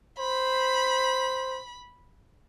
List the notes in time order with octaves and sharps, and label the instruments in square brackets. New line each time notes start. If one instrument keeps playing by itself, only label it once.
[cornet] C5 [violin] B5